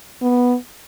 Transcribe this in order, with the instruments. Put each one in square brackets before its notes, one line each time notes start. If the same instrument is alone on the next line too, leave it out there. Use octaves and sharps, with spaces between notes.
[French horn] B3